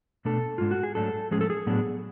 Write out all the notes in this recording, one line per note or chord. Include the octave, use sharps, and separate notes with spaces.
B2 A3 D4 A4
G#2 G#3 D4 F4
F#4
G#4
G#2 F#3 A3 D4 A4
A2 F3 G#3 C#4 G#4
A4
G#4
A2 F#3 B3 D4